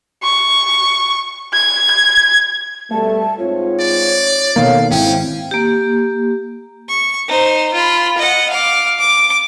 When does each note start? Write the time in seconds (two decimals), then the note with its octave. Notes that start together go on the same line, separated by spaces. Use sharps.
0.23 C#6
1.53 G#6
2.92 B2 G3 A3 A5
3.39 G#2 C4 F4 C#5
3.80 D5
4.56 B2 D#3 A#3 D#4 A4 C#5 F5
4.91 G#1 C4 C#4 E4 G5
5.51 A#3 G4
6.89 C#6
7.28 D#4 C5
7.74 F4 B5
8.18 D#5 F#5
8.50 F5 D6
8.99 D6